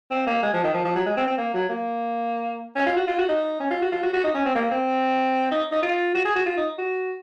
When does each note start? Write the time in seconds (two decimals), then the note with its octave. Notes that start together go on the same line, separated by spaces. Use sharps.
0.11 C4
0.27 A#3
0.43 G#3
0.53 F3
0.64 D#3
0.74 F3
0.85 F3
0.96 F#3
1.06 G#3
1.17 C4
1.27 C4
1.38 A#3
1.54 F#3
1.69 A#3
2.76 C#4
2.86 F4
2.97 F#4
3.07 F4
3.18 F#4
3.29 D#4
3.60 C#4
3.71 F4
3.82 F#4
3.92 F4
4.03 F#4
4.13 F#4
4.24 D#4
4.35 C#4
4.45 C4
4.55 A#3
4.71 C4
5.51 D#4
5.72 D#4
5.82 F4
6.14 F#4
6.25 G#4
6.35 F#4
6.46 F4
6.57 D#4
6.78 F#4